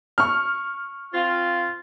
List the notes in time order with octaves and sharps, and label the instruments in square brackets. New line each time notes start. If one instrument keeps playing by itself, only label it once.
[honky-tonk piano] C#6 F6
[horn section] C4 F4